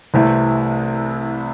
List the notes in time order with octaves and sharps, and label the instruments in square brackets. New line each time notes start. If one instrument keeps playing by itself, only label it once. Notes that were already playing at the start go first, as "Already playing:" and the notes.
[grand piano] C2 C3 E3 A3 E4